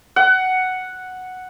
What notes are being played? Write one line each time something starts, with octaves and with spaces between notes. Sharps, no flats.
F#5